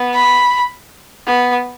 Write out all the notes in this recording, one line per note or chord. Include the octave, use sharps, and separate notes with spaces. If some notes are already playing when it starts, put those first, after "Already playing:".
Already playing: B3
B5
B3